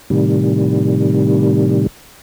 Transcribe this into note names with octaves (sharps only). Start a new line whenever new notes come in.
A2 C3 D#3 G3